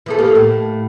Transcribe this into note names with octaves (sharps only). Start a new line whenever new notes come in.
E3 B3 A4
A#3 G4 A4
A2